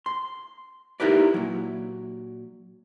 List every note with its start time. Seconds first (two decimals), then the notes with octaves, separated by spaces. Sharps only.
0.06 C6
1.00 D#4 E4 G4 A#4 B4 D5
1.34 A#2 F#3